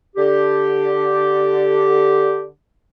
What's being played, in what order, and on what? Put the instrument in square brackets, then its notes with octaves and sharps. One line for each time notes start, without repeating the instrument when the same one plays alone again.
[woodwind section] D3 G4